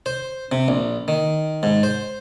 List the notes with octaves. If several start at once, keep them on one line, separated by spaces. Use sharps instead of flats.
C5
C3
A#1
D#3
G#2
C5